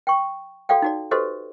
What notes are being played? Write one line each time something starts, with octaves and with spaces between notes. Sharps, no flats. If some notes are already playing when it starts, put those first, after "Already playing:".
G5 C#6
F#4 A4 D5 F5 G5
D#4 F#4 D5
F#4 G4 A4 B4 C5 D#5